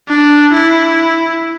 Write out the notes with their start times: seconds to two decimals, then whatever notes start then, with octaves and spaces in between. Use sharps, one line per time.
0.08 D4
0.52 E4